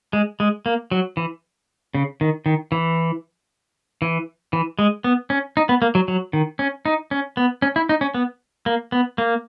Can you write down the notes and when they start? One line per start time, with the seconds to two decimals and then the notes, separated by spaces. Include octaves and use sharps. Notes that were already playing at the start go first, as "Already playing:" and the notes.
0.13 G#3
0.40 G#3
0.66 A#3
0.91 F#3
1.17 E3
1.95 C#3
2.21 D#3
2.46 D#3
2.72 E3
4.02 E3
4.53 E3
4.79 G#3
5.04 B3
5.30 C#4
5.57 D#4
5.69 B3
5.82 A#3
5.95 F#3
6.08 F#3
6.33 D#3
6.59 C#4
6.86 D#4
7.11 C#4
7.37 B3
7.62 C#4
7.76 E4
7.89 D#4
8.01 C#4
8.14 B3
8.66 A#3
8.92 B3
9.18 A#3